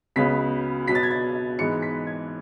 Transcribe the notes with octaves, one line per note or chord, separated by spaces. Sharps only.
C#2 C#3 F#3 B3 B6
B2 F#3 B3 B6
A6
G#6
A6
G#2 E3 G#3 B3 C#7
B6
G#6